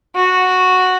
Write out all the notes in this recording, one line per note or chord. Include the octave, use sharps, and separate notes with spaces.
F#4